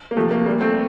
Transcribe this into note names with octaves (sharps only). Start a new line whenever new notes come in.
A#3
C3 F3 A3
A#3
A#2 G3 A#3
A3 C4